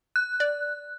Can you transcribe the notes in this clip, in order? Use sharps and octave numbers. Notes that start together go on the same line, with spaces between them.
F#6
D5